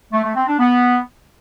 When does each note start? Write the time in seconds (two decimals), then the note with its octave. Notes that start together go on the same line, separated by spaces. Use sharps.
0.13 A3
0.24 A3
0.36 C4
0.47 D4
0.59 B3